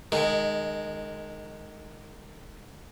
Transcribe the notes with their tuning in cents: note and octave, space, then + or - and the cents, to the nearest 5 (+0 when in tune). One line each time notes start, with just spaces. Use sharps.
D#3 -25 G#3 +0